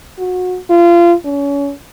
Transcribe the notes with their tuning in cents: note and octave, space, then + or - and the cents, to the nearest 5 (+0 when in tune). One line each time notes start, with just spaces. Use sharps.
F#4 -25
F4 -25
C#4 +30